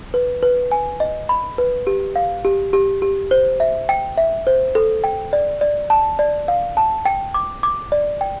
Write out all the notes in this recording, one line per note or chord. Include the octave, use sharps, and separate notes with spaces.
B4
B4
G#5
D#5
B5
B4
G4
F5
G4
G4
G4
C5
E5
G5
E5
C5
A4
G5
D5
D5
A5
D5
F5
A5
G5
D6
D6
D5
G5